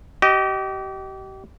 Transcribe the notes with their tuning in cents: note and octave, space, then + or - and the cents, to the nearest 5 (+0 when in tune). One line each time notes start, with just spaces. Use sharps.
G4 -35 D#5 +0